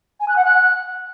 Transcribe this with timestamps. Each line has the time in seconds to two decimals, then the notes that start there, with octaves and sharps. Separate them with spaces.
0.20 G#5
0.28 F#6
0.36 F#5
0.44 F#6